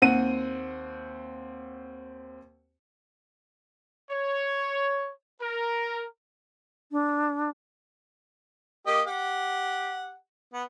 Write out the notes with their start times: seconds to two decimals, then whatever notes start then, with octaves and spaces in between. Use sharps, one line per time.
0.02 D#2 C4 C5 F#5 D#7
4.10 C#5
5.40 A#4
6.91 D4
8.87 A#3 G4 D#5
9.07 G4 F#5
10.53 B3